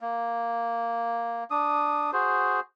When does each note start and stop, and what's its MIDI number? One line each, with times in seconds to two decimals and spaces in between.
0.01 1.44 58
1.51 2.11 62
1.51 2.11 87
2.13 2.60 66
2.13 2.60 68
2.13 2.60 72